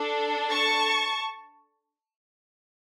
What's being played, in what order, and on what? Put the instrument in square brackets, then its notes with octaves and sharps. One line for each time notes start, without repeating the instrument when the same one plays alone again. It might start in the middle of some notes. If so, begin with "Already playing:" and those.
Already playing: [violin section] D4 A4
A5 C#6